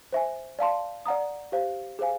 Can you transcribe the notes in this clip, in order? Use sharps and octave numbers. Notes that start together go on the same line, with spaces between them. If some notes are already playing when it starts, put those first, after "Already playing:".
C5 E5 G#5
D5 F5 A5 C6
D5 F#5 A#5 D#6
G4 C5 F5
G#4 C5 F5 G#5